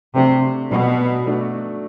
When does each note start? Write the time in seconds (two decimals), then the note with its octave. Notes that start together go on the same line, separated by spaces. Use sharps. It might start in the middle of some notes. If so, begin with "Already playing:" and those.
0.15 C3 F#3 A3 D4 F#4
0.70 B2 F#3 A3 D4 F#4
1.26 F#3 A3 D4 F#4